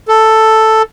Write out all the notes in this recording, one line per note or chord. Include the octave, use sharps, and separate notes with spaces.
A4